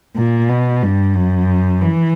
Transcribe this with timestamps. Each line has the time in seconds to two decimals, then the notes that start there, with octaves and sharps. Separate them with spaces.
0.16 A#2
0.49 B2
0.83 G2
1.15 F#2
1.81 E3